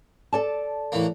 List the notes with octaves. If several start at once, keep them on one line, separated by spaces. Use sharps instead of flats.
A4 D5 A5
A2 E3 A#3